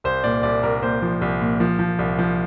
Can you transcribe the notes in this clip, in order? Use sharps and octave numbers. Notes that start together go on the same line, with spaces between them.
C2 C5
A#2 D5
C2 D5
C2 A#4
A#2 C5
F3
C2
A#2
F3
F3
C2
F3